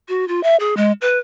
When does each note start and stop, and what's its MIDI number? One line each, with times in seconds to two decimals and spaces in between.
0.09 0.27 66
0.28 0.43 65
0.43 0.56 76
0.60 0.75 68
0.77 0.92 56
1.01 1.18 71